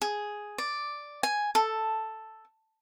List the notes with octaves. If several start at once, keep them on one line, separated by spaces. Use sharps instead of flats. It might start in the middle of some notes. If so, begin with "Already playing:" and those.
G#4
D5
G#5
A4